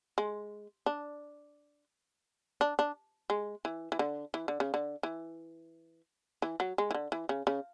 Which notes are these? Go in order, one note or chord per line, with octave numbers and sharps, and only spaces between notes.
G#3
D4
D4
D4
G#3
E3
E3
D3
E3
D3
C#3
D3
E3
E3
F#3
G#3
E3
D3
E3
C#3
C#3